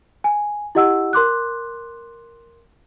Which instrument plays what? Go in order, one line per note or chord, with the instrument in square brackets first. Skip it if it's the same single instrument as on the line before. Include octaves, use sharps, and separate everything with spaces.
[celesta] G#5
E4 G4 D#5 F#5 E6
A#4 C6 D6 F#6